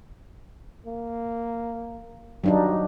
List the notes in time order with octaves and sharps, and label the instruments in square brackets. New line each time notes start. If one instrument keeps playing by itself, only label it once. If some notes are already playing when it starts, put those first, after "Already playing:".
[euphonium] A#3
[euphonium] G2 [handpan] F#3 D4 D#4